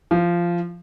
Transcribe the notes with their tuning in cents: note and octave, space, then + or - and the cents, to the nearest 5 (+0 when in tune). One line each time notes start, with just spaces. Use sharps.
F3 -15